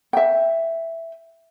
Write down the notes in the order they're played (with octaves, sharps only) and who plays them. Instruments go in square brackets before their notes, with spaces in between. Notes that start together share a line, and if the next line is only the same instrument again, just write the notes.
[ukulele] E5 G5